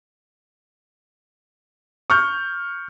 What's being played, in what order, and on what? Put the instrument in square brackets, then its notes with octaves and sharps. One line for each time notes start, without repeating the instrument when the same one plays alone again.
[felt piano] C#6 F6 G6